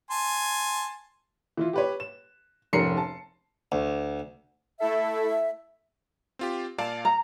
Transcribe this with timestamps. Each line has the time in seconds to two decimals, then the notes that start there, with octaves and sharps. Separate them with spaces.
0.11 G#5 A5 C6
1.57 E3 E4 F4
1.73 G4 B4 C#5
2.00 E7
2.73 F1 G#2 C#4 A#4 C7 C#7
2.97 A5
3.72 D2
4.80 A3 E4 A4 E5
6.39 C4 F4 G4
6.78 A#2 D5 F5 A5
7.05 A#5